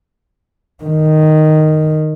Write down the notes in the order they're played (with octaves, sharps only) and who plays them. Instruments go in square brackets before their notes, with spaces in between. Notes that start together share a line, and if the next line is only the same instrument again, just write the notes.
[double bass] D#3